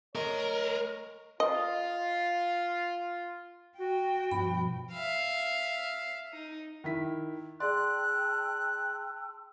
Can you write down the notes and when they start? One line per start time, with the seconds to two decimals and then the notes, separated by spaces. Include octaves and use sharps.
0.15 A3 A#4 C#5 D#5
1.40 F4 D#5
3.78 F#4 G5
4.31 G2 B2 F3 B5
4.92 E5 F5
6.33 D#4
6.84 D#3 E4 B6
7.60 G#4 D5 G5 A5 C6 E6 F#6